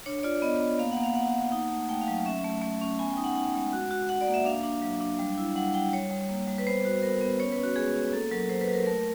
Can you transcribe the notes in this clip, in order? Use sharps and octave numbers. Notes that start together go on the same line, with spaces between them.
D4 C#5
F4 D5
B3 D#5
B3
A#3 F5
F#5
A#3
F5
A#3 F#5
A#3
D#4
A3
A3 G5
F5
F#3
C#4 E5
A3
A3
C#4
B3 G#5
G5
D#4
F#5
D#4 F#5
G#3
F#4
F#4
F#4 F#5
D5
A#3
E5
D4 F5
D4
F#3
D4
G3
E4
G3 F#5
G3 G5
G3 C#5
G3
A#3
G3
B4
B3 C5
F#4 C5
B3 A#4
B3
C#4 C#5
B4
C#4 F#4
G#3 G#4
C#4
A#3 A4
F#3 A#4
F#3 C5
B4
F#3
A#4
A3 A#4